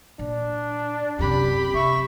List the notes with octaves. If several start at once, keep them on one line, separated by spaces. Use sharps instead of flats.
A#2 D4
F#2 C3 G4 B5
C3 E5 C#6